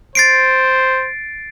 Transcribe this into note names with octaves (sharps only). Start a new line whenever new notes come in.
C5 A6 C7 D7